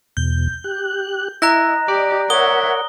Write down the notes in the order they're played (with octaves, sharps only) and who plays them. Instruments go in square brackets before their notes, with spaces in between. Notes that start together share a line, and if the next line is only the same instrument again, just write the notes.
[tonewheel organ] E2 B2 [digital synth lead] G6
[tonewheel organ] G4 F#6
[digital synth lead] E4 [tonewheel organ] D#5 [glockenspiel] A#5 F#6 A#6
[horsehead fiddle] G4 [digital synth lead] D5
[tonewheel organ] A#4 F#5 [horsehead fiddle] C#5 E5 [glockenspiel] D#6 G7